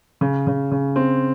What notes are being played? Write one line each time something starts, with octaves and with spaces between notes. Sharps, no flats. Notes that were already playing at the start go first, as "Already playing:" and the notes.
C#3
C#3
C#3
C4